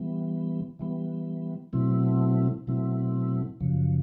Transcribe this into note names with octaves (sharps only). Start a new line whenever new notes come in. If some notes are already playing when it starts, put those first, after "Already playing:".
Already playing: E3 G3 B3
E3 G3 B3
B2 F#3 A3 C4 E4
B2 F#3 A3 C4 E4
F#2 C#3 F3